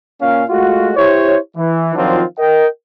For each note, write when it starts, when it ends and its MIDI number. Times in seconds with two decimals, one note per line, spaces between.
0.21 0.43 46
0.21 0.43 61
0.21 0.43 77
0.50 0.91 56
0.50 0.91 57
0.50 0.91 65
0.50 0.91 66
0.96 1.38 64
0.96 1.38 67
0.96 1.38 72
0.96 1.38 73
1.57 1.92 52
1.95 2.23 51
1.95 2.23 53
1.95 2.23 54
1.95 2.23 60
1.95 2.23 62
1.95 2.23 65
2.38 2.66 70
2.38 2.66 75
2.38 2.66 79